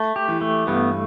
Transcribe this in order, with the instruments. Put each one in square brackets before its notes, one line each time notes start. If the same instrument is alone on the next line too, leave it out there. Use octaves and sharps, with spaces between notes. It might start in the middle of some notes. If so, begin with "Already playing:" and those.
Already playing: [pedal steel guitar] A3
G4
[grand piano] E3
[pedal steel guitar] A3
[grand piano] G2 [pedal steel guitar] B3